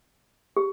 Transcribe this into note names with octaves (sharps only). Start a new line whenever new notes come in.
G4